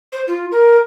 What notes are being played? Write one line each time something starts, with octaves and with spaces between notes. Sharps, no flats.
C5
F4
A#4